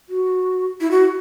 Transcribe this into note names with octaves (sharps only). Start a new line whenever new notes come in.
F#4
E4
F#4